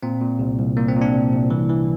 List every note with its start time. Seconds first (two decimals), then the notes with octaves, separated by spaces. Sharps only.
0.03 A#2 C4
0.21 A#2
0.39 C2
0.58 C2
0.77 A#2 A#3
0.88 C4
0.96 A#2
1.01 D4
1.13 C2
1.33 C2
1.50 E3
1.69 E3